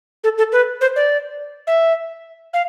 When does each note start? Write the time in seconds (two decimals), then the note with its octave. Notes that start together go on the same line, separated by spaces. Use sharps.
0.24 A4
0.38 A4
0.52 B4
0.81 C5
0.96 D5
1.67 E5
2.54 F5